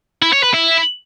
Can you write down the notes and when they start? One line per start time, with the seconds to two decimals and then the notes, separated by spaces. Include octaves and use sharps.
0.22 E4
0.33 C#5
0.43 B4
0.54 E4